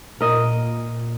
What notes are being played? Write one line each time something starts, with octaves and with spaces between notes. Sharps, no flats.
A#2 A#4 D#5